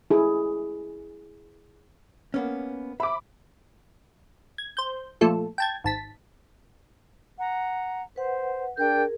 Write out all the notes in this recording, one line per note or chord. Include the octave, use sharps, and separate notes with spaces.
E4 G#4
A#3 B3 C#4
E5 B5 D6
G#6
C5 G6
A#2 F3 A3 A4
G5 A5 G#6
G#1 A5 B6
F#5 A#5
B4 C5 F#5
D4 G#4 A#4 G5 G6